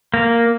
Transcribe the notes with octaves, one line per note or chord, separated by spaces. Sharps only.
A#3